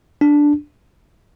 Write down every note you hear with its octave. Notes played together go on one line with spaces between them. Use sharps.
D4